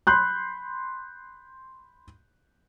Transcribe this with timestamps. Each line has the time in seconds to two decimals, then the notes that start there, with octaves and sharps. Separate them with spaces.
0.07 B5 C6 F#6 G6